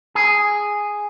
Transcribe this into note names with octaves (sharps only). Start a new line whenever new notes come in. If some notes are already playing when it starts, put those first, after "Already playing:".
G#4